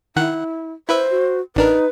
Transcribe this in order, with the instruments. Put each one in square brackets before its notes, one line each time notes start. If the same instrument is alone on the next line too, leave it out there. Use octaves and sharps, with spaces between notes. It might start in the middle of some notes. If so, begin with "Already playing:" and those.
[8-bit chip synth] D#3 F#5 F#6 [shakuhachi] E4
[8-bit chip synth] E4 B4 E5 [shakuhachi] C5
[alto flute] F#4
[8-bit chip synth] A1 D4 A#4 [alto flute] D#4 [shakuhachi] B4